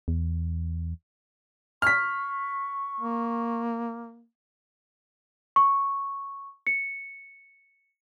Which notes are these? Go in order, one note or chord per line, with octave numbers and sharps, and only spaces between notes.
E2
C#6 F6 B6
A#3
C#6
C#7